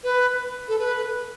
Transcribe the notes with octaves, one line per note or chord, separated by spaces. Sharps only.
B4
A4
B4